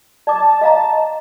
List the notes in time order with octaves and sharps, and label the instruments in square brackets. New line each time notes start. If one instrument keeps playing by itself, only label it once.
[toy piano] D5 D6 [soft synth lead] A5
[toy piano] D#5 F5 A#5